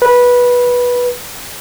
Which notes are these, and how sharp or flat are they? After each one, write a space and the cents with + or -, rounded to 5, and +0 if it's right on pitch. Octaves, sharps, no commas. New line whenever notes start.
B4 -15